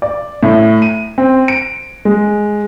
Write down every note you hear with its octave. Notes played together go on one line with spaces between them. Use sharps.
D5
A2
D#7
C4
D7
G#3